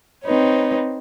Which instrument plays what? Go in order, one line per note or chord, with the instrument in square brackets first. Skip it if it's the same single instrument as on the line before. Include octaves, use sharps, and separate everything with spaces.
[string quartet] C4 D#4 B4 C#5